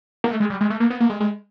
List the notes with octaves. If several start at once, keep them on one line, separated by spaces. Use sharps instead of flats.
A#3
A3
G#3
G3
G#3
A3
A#3
B3
A#3
G#3
G#3